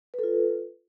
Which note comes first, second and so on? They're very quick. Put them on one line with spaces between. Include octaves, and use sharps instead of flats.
B4 A4 F4